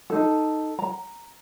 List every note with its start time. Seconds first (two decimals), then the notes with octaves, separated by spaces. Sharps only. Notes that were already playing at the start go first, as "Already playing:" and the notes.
0.10 D#4 A4
0.79 A#5